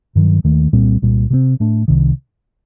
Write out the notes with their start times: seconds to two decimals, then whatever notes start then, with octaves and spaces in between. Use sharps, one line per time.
0.15 G2 D#3 F#3
0.44 D#2 D#3 A3
0.73 C2 A#2 G3 C4
1.02 C2 A#2 G3
1.30 C3 F#3 C4
1.60 A2 A3 D4
1.88 C2 C3 D#3